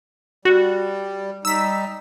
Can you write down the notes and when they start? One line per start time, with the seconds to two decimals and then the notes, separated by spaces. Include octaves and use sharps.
0.45 G3 F#4
1.45 G3 D#4 E6 B6